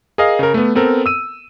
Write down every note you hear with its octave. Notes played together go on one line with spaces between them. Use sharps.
G#4 A#4 D#5 F5
C#3 A#4
A3 B3
B3 C4 A4 A#4
E6 D#7